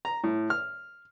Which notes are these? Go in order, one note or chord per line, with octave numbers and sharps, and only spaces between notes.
A#5
A2
F6